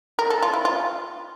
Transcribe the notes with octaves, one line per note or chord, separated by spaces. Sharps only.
A#4
A4
F4
E4
F4